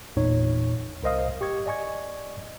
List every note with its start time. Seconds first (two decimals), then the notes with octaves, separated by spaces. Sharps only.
0.16 G#1 E2 A#2 D#4 C#5
1.03 C2 A#4 C5 D#5 F5 D#6
1.41 G4 C#6 G#6
1.66 D5 D#5 G#5 C#6 G#6